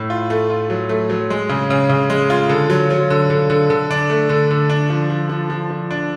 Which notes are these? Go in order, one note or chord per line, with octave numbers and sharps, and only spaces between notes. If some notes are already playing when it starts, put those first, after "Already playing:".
Already playing: A2
F4
A3
F4
F#3
A3
F#3
G#3
C#3
C#3
C#3
G#3
F4
D3
F#3
F#3
D3
D3
D3
D3
D4
A3
D3
D3
D4
F3
F3
F3
F3
F3
D4